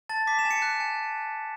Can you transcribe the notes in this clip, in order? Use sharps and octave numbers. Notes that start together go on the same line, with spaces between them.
A5 A6
D6 B6
E7
G#5
C#7
F#6
G#5